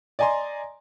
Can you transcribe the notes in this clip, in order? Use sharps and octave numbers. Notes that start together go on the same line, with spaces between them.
D5 D#5 G#5 A#5 C6